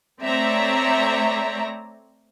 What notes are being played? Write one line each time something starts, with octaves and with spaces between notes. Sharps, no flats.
A3 C4 C#5 D5 E5 A#5